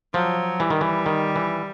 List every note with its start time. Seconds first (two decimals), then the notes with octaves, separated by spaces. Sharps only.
0.14 F3 F#3
0.59 E3 G3
0.70 D#3
0.81 E3
1.06 D#3
1.36 E3